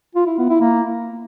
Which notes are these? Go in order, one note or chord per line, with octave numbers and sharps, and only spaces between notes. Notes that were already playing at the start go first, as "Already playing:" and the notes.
F4
E4
B3
E4
A#3